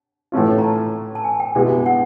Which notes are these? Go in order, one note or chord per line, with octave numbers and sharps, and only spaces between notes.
A2 E3 A3 C#4 F4
A#5
A5
A5
G#5
G5
B2 G#3 B3 E4 G4
F#5